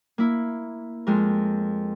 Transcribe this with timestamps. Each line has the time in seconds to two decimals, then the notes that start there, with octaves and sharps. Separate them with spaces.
0.18 A#3 E4
1.07 F2 G#3 A#4